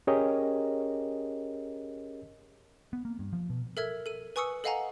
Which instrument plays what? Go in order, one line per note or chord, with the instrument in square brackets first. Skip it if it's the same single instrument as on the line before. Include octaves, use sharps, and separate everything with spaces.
[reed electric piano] C#4 G4 G#4 A#4 C#5 D#5
[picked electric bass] B3
A#3
G2
F3
B2
[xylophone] A4 A#4 E5 E6 G#6
A4 D#7
B4 G#5 C#6 D#6 E6 C#7
A4 D#5 F5 F#5 G#5 A#5